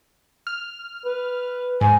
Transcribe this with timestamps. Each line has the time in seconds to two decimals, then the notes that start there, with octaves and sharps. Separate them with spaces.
0.47 F6
1.05 B4
1.81 G#2 G#5